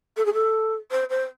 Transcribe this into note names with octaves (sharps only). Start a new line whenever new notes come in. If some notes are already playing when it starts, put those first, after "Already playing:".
A4
G#4
A4
C5
C5